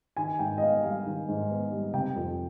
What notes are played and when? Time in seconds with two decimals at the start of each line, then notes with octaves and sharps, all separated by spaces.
0.17 D#3 G#5
0.39 G#2 G5
0.58 D#5
0.61 B3 F5
0.83 G3 F5
1.05 D#3
1.28 G#2
1.50 B3
1.71 G3
1.93 C3 G5
2.16 F2